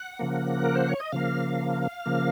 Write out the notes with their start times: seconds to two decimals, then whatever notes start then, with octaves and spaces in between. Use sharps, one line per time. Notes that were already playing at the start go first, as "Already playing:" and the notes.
Already playing: F#5
0.19 C#3 F3 A#3
0.64 A#4
0.75 C5
0.89 C#5
1.00 D#5
1.12 C#3 F3 A#3 F5
2.06 C#3 F3 A#3